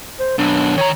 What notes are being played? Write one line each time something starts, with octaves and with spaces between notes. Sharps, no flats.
C5
F#2 B2 D4
D#3 C#5 A#5